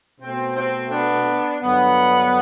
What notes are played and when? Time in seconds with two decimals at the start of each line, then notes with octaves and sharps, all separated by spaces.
0.20 B2 A3 C4
0.56 C4
0.91 B3 D4
1.61 G2 D3 F#3 B3